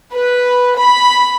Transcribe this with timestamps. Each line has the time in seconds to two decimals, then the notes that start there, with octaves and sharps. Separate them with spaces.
0.15 B4
0.78 B5